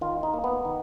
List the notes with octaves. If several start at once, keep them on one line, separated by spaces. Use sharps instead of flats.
D#3 F4
D#4
A#3
B3
D#3